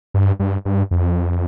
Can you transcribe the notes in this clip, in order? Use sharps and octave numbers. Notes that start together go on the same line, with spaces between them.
G2
G2
G2
F2